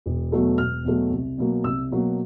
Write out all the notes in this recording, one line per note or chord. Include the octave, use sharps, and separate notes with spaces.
E1
E2 B2 F#3 A3
E1 F6
E2 B2 F#3 A3
C2
B2 F#3 A#3
C2 E6
B2 F#3 A#3